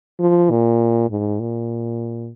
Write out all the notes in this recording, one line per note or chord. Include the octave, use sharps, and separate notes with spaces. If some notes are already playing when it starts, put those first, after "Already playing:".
F3
A#2
G#2
A#2